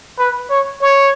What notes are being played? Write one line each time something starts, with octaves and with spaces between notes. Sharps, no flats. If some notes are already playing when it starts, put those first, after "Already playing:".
B4
C#5
C#5